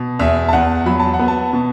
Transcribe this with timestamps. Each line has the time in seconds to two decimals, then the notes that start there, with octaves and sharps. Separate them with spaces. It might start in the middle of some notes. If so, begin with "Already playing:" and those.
Already playing: B2
0.19 E2 E5
0.48 A5
0.53 E2 F#5
0.86 F#3 B5
1.00 A5
1.14 F#5
1.19 B3
1.28 A5
1.53 B2